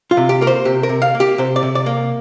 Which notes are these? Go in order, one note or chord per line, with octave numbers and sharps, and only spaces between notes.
F4
C3
G4
A#3 A#4
C5
C3 G4
A#4
C3
F5
A#3
G4
C3 C5
D5
C3
D5
A#3